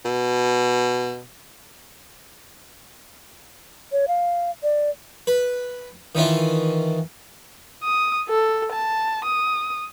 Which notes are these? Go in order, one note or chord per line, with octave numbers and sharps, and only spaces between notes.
B2
C#5
F5
D5
B4
D#3 E3 C#4 F4
D#6
A4
A5
D#6